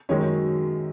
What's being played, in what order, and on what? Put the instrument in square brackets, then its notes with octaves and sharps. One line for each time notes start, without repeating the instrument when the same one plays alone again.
[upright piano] F#2 D#3 G#3 C#5